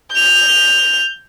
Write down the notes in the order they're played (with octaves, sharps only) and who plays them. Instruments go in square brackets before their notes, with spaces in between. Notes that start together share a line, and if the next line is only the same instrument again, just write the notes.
[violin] G6 F7